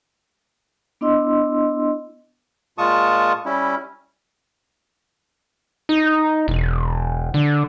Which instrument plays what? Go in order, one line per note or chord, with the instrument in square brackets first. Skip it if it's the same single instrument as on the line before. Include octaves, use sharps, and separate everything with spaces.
[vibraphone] B3 D4 E4 D#5 C6 E6
[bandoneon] A#2 G#3 F4 A5 C#6 D#6
G3 C#4 E4
[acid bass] D#4
E1
D3